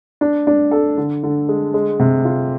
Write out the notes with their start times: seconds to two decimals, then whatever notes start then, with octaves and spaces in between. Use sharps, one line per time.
0.21 D4
0.47 D4
0.71 A4
0.97 D3
1.23 D3
1.49 G#3
1.74 G#3
2.00 C3
2.25 F4